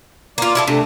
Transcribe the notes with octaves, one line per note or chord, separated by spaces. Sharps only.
A#3 F4 D5
E4 F#4 A4
C3 A3 D4